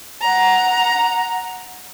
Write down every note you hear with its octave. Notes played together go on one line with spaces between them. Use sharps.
F#5 A#5